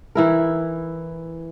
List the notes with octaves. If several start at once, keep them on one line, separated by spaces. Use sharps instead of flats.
E3 E4 A#4